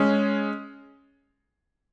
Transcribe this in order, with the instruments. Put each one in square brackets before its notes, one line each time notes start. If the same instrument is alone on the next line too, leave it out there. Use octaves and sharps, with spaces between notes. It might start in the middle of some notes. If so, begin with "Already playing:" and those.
Already playing: [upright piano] G#3 C#4